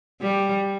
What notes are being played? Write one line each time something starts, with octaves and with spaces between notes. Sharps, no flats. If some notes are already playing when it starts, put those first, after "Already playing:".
G3